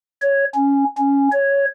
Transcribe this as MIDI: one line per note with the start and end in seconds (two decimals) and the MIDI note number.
0.22 0.45 73
0.55 0.84 61
0.98 1.28 61
1.32 1.65 73